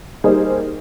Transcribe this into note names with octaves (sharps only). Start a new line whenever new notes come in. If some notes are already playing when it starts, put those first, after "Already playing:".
G3 A#3 D#4 G#4 C5